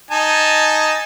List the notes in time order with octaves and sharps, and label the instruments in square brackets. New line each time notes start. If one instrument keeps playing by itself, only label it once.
[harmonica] D#4 G#5 A5